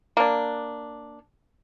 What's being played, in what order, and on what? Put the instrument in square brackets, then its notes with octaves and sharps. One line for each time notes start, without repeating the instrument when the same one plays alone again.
[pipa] A#3 D4